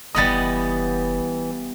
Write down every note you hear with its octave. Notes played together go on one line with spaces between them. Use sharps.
F#1 E3 G3 B3 D#5 D#6 A6